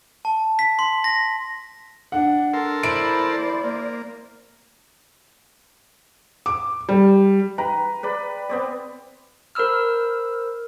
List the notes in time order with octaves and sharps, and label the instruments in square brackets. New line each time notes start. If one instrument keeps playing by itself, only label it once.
[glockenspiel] A5
B6
C6
A#6
[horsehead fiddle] D4 [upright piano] F#5
[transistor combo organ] A4 A#4 C6
[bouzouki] E4 [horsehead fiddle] C5 D5 [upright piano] D7
[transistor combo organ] A#3
[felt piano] D6
G3
[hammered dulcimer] B4 [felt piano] G5 A#5
[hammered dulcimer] B4 D5 B5
B3 C4 D5
[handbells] A#4 C5 B5 E6 F6